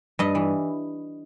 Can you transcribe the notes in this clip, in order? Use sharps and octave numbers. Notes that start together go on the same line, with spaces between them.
G2 D#5
E3